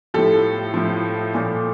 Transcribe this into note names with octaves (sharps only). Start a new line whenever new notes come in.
A2 F3 G4 A4
A2 F3
A#2 F3